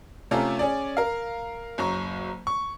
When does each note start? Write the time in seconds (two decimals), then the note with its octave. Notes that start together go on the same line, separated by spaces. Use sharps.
0.31 C3 A3 C#4 F4 A4 A#5
0.59 C#4 G#4 D5
0.97 A#4 F5
1.78 F#1 F#3 A#5 C#6
2.47 C#6